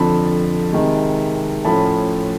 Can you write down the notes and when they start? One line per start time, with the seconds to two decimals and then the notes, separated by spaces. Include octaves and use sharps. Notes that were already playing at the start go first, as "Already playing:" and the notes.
Already playing: F2 D3 F3 A5 B5
0.72 C3 D#3 G#3
1.65 A2 F3 A3 C#4 A5 B5